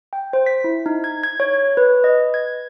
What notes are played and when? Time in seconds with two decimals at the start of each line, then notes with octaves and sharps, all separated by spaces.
0.13 G5
0.33 C5
0.46 B6
0.64 E4
0.86 D#4
1.04 G#6
1.23 G#6
1.40 C#5
1.77 B4
2.04 D#5
2.34 G#6